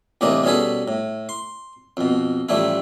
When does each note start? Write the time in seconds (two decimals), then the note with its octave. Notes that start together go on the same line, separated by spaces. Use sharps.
0.21 C2 A2 E3 A#3 D4 D#5
0.44 B2 G3 C#4 G#4 A4 B4
0.88 A2
1.29 C6
1.97 F2 B2
2.49 A1 F3 G3 A3 E4